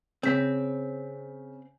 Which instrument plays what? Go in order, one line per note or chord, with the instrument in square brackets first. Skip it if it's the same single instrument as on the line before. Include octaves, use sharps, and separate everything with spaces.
[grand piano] C#3 B6 [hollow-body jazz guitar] C4